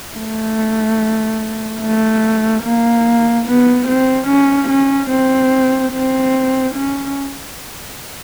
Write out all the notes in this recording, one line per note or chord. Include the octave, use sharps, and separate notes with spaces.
A3
A3
A#3
B3
C4
C#4
C#4
C4
C4
C#4